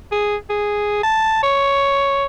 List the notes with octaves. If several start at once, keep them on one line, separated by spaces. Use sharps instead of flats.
G#4
G#4
A5
C#5